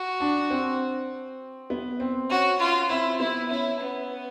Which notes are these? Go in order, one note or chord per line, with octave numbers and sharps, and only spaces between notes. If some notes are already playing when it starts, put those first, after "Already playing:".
Already playing: F#4
D4
C4
B3
C4
C#4 F#4
F4
C4 E4
B3 E4
C#4 E4
B3